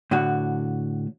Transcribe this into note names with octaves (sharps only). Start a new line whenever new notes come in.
A2 D3 F#4